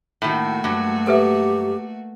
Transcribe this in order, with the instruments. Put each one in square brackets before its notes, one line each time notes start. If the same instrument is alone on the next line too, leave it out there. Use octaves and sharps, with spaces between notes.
[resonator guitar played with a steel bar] A2 D#3 [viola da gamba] A3 A#3 F#4
[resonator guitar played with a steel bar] G2 F#3
[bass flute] G4 [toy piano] A4 B4 E5